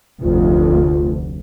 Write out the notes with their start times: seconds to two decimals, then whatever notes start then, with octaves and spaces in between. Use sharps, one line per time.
0.23 F1 D2 F4